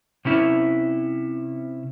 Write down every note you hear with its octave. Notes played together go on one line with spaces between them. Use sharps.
C3 C#4 E4